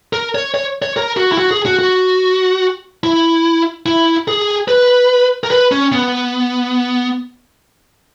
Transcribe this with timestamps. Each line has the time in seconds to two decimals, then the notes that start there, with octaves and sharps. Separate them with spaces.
0.13 A#4
0.35 C#5
0.54 C#5
0.82 C#5
0.97 A#4
1.17 F#4
1.32 E4
1.38 F#4
1.51 G#4
1.66 F#4
1.79 F#4
3.04 E4
3.86 E4
4.28 G#4
4.68 B4
5.44 A#4
5.51 B4
5.71 C#4
5.92 B3